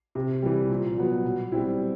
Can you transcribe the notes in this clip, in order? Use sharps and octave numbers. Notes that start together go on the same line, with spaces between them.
C3
E3 G3
A#2
F#3 B3
B2
G3 C4 E4